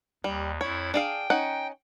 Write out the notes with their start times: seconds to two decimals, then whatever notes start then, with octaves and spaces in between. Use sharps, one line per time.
0.24 D#2 G3
0.61 F2 E4 C#5 G#6
0.94 D4 G#4 F5 G5
1.30 C#4 D#4 F#5